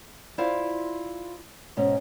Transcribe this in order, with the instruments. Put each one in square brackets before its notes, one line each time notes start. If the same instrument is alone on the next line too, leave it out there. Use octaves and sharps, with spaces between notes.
[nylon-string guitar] E4 F4 C5 D5 F5
G#2 B2 C#4